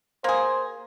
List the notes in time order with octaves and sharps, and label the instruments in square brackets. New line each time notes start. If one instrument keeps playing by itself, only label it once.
[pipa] A#3 G#4 [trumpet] C5